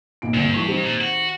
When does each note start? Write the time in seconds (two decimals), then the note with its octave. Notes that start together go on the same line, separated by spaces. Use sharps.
0.22 G#1 A#2 D7
0.34 G#1 D2 G2 A#2
0.54 E3 G#3 C#6
0.68 D#3 C4 G4
0.83 A#2
1.01 F#4